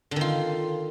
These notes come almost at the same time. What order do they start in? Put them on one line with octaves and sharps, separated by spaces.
D3 D#3 F4